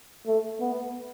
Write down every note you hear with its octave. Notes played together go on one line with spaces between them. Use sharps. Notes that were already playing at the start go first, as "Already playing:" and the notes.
A3
B3